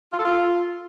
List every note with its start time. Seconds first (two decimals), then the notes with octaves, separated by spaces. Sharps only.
0.13 F4
0.19 A4
0.25 F4